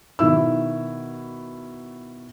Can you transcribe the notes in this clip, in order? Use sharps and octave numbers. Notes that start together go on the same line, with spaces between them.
B2 D#3 E4 E6